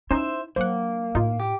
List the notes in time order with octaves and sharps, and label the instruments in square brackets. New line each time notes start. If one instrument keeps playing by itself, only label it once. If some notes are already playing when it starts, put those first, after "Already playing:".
[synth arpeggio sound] C#4 D#4 [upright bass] E4 [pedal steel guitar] C5 E5
[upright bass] F#3 D4 [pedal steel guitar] A#3 [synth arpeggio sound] C5 F#5
[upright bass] A2 [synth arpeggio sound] D#4 F4
[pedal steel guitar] G4